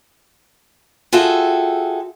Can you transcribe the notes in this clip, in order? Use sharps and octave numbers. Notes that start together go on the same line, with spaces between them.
F4 F#4 G#4 A4 E5 G5